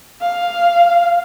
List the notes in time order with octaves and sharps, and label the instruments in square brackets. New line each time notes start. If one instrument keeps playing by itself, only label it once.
[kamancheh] F5